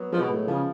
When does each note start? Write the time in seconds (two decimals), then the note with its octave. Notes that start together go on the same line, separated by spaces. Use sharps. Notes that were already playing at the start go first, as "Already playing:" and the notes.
Already playing: F#3 B3
0.12 F3 G#3
0.21 B2
0.30 A2
0.48 C#3 F3